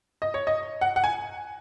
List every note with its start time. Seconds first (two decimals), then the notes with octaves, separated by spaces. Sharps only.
0.22 D#5
0.34 C#5
0.47 D#5
0.81 F#5
0.96 F#5
1.04 G#5